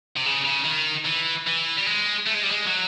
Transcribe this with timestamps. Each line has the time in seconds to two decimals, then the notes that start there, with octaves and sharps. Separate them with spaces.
0.17 C3
0.26 C#3
0.46 C#3
0.65 D#3
1.06 E3
1.47 E3
1.77 G3
1.86 G#3
2.27 A3
2.35 G#3
2.44 G3
2.51 G#3
2.67 F#3